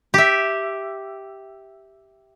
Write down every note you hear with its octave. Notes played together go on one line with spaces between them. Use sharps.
G4 E5